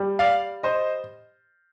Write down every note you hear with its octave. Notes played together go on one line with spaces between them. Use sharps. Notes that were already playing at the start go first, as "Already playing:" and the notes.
Already playing: G3
D5 F5
C5 D#5